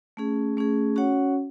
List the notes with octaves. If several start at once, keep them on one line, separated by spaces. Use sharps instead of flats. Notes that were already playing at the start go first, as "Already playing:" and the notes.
A3 C#4 G#4
A3 C#4 G#4
C#4 F#4 C#5 F#5